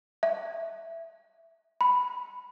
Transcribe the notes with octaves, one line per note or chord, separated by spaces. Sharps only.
E5
B5